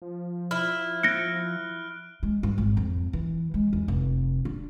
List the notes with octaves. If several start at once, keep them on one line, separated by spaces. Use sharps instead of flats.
F3
E4 F6
F#6 A#6 C#7 D7 G7
G#3
G2
G#1
F2
E3
G#3
E2
F1
D4